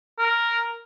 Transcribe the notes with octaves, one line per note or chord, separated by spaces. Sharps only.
A#4